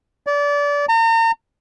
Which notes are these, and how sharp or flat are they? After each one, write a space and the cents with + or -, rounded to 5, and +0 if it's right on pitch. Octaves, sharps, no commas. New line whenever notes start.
D5 -25
A#5 -40